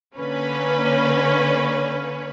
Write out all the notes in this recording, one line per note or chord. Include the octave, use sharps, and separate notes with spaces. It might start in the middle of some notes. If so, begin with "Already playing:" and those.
D3 A#3 C#4 B4 C#5